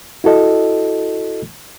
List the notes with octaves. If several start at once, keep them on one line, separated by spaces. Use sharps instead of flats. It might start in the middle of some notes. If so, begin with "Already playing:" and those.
E4 F#4 A4 D#5